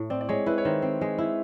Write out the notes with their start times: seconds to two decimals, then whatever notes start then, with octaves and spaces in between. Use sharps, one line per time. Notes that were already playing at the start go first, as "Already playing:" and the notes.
Already playing: A2
0.10 C4 D5
0.21 D5
0.29 G#3 C#5
0.46 E4 B4
0.58 C#5
0.65 D#3 C5
0.82 C4
1.01 G#3
1.18 E4